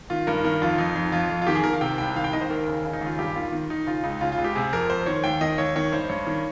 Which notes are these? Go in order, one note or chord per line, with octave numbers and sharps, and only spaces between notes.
D#3 F4
G2 A#4
D#3 A#4
F2 F4
F2 D#4
F2
F2 F4
F2
F4
D#3 G4
G#4
D#3 A#4
F5
C3 G5
C2 G5
D#3 F5
G5
D#3 D#5
C5
D#2 A#4
C#3
C#3
D#4
D#2
F4
G2 G4
D#3 F4
D#3
D#3 D#4
C#3 F4
C#2 D#4
C#3 F4
F4
C#2
G4
C3 G#4
F2 A#4
F2 C5
D#3 C#5
D#2 G5
D#3 D#5
D#2 C#5
D#3 C#5
G2 C5
G2 C#5
D#3